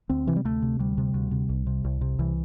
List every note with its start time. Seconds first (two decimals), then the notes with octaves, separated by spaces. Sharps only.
0.09 D2 C4
0.27 C3 E3
0.36 G3
0.45 D2 A3
0.62 C3
0.79 D2 G3
0.98 C3
1.14 D2
1.31 C3
1.49 C2
1.67 C3
1.84 C2
2.01 C3
2.19 C2 E3